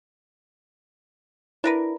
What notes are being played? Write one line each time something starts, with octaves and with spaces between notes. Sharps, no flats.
D4 E4 A#4 B4